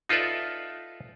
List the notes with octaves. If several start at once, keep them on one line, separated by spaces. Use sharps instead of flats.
D#4 F4 A4 B4 D5 E5